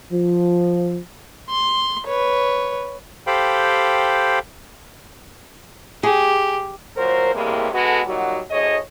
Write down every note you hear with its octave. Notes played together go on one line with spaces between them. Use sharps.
F3
C6
B4 C#5
G4 A4 C5 F5 G5 B5
G4 G#4
A#2 F#3 A#4 C5
E2 A2 C3 G3 G#3 A#3
G#3 B3 F#4 A4
A#2 F#3 G3 D#4 F#4
D2 A2 G#4 C#5 D#5